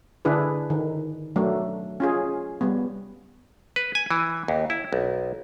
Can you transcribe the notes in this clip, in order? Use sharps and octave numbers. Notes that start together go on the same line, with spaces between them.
D3 D4 E4 G#4 B4
D#3
F#3 A3 D4
C#4 F4 G#4
G3 B3
B4
G#5
E3
D#2
E4
B1